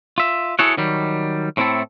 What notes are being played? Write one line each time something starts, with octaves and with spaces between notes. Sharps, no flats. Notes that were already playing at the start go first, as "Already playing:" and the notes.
F4 E5
E4 F#4 G#4 A4 C#5 F#5
D#3 F#3 G3
A2 C4 E4 A4